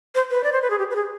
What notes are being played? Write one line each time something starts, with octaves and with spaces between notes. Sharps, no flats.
C5
B4
D5
C5
B4
G#4
G4
B4
G#4